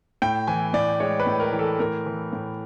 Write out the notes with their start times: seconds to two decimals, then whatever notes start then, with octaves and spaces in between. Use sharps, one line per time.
0.22 A2 G5
0.47 E3 G#5
0.74 A2 D5
1.00 G#3 C#5
1.20 B4
1.27 A2
1.40 A#4
1.53 E3
1.59 A4
1.79 A2 A#4
2.06 E3
2.33 A2